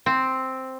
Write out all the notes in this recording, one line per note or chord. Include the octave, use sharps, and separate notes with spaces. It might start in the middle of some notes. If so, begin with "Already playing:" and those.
C4